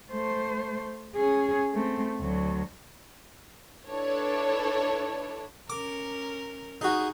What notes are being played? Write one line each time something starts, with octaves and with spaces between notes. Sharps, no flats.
A3 C5
C#4 G#4
A3 C4
D2 F#3
D4 E4 A4 B4 C#5 D5
C#4 A#4 D6
D#4 F#4 G#4